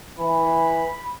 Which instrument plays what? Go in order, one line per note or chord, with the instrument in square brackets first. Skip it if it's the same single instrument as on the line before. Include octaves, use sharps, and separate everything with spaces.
[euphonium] E3 [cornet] B5